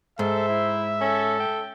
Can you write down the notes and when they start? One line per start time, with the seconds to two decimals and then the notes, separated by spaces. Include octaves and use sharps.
0.19 G#2 A4 C5 E5
0.49 E4
1.01 C#4 A4
1.40 G5